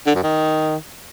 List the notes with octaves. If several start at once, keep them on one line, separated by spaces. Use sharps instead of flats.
D3
F#2
D#3